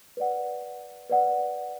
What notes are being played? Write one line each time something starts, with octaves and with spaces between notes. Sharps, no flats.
B4 D5 F#5
B4 D5 F#5